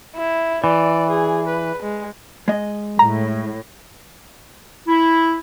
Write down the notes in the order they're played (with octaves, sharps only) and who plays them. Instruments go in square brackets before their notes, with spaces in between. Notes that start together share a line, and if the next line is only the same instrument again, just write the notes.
[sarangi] E4
[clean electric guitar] E3 [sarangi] D5
[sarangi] G#4
B4
G#3
[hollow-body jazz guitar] G#3 D#5
[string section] A2 [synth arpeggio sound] A#5
[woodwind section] E4